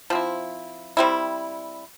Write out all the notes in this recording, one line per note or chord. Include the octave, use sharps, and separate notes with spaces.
F3 C4 E4
G3 C4 E4